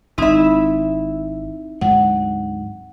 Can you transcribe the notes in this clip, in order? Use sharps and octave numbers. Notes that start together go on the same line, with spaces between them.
G#1 C4 D#4 E4 E5
D2 G#2 F#3 F#5